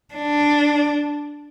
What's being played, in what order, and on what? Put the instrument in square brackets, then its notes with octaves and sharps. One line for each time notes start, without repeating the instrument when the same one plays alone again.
[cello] D4